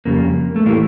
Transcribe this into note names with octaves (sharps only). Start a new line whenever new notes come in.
F2 C#3 G3 A#3
A3
A2 E3 G3 A#3